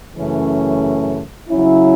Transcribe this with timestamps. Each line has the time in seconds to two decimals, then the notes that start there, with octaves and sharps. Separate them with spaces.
0.15 F#2 C#3 E3 A3 C#4
1.49 C#3 F#3 C#4 E4